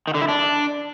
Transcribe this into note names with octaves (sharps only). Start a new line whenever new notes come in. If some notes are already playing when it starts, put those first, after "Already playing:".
D#3
D3
E4
D4